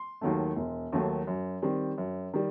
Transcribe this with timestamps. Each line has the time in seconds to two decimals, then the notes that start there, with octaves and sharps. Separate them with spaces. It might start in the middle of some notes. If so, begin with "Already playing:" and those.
Already playing: C6
0.21 D#2 D#3 F#3 A3
0.56 E1
0.92 D#2 D#3 F#3 A3
1.27 F#2
1.62 D#3 G3 C4
1.98 F#2
2.34 D#3 G3